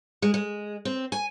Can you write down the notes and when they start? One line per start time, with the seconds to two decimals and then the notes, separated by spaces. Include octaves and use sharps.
0.22 G#3
0.34 G#3
0.85 C4
1.12 G#5